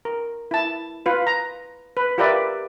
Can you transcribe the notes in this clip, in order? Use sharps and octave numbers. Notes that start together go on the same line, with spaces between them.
A#4
E4 A5
F4 B4
A#5
B4
F4 G4 A#4 B4 D5 E5